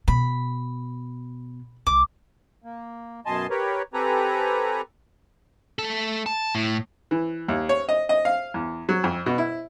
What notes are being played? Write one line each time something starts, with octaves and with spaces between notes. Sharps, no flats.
B2 B5
C2 D6
A#3
F#2 B2 D#5 G#5 A5 C6
G4 A#4 B4 C#5
C4 G4 A4 B4 G#5 A#5
A3 A4
A5
A2
E3
D#2
C#5
D#5
D#5
F5
E2
F#3
F2
B2
E4